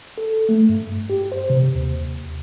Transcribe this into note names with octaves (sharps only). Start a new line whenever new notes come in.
A4
A3
G2
G4
C5
C3
D#2